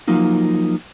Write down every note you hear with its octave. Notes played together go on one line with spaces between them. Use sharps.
F3 F#3 A#3 D#4 F4